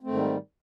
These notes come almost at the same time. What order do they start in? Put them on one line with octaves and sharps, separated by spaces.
C4 A3 G#2 D#3 G3